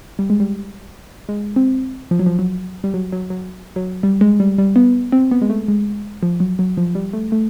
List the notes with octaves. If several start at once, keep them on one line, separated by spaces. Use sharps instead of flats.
G3
G#3
G3
G#3
C4
F3
F#3
F3
F#3
G3
F#3
F#3
F#3
F#3
G3
G#3
G3
G3
B3
C4
B3
G#3
A3
G#3
F3
F#3
F#3
F3
G3
A3
A3